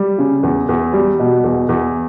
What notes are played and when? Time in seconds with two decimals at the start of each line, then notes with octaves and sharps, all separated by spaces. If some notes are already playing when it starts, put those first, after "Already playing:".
Already playing: G3
0.18 C#3
0.43 E2
0.69 E2
0.93 G3
1.19 B2
1.44 E2
1.69 E2